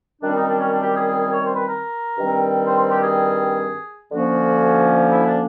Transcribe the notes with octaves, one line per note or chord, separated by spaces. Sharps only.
F#2 D#3 G3 C4 D4
D#4
D4
C#4
D4
G4
G#4
G#4
G#4
C#5
C5
B4
A#4
G2 D#3 G3 C4
C5
C5
G4
G#4
D2 D3 F3 A#3 C#4 F#4
E4
D4